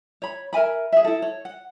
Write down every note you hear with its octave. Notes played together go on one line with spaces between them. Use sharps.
C#5 B5
A#4 E5 G#5 B5
G#4 E5
E4 A4
C#5
F#5